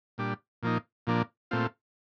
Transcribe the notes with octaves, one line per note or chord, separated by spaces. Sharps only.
A#2 G3 D4
A#2 F3 A#3 D#4
A#2 F3 A#3 D4
A#2 A3 C4 F4